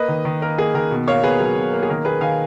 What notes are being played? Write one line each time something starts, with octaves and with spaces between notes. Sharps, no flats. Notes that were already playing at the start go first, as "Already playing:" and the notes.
Already playing: A#3 B4 D#5
D#3
D#3
A#3 A#4
A#3 G#4
D#3 A#4
B2
A#3 C#5 F5
B2 G#4 B4
F#3 G#4
B2
A#3
G#4
D#3 A#4
A#3 G#4 B4
D#3 F5 G#5